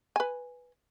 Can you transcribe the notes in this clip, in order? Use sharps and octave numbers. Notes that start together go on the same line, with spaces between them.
B4 G#5